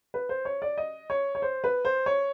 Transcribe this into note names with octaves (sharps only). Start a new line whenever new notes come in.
B4
C5
C#5
D5
D#5
C#5
C#5
C5
B4
C5
C#5